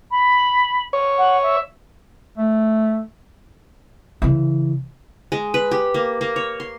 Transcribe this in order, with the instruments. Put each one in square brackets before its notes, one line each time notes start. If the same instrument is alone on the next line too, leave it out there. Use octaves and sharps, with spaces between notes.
[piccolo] B5
[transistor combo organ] C#5
[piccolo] F#5
E5
[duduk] A3
[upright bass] C#3 E3
[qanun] G#3
B4
G4
A#3
A#3
C#5
C6